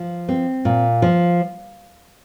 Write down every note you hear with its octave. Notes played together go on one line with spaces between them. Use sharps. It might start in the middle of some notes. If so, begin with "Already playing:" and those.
Already playing: F3
C4
A#2
F3